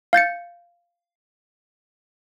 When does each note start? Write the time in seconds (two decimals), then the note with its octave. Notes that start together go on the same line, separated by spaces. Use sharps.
0.13 F5 G6 A6 C#7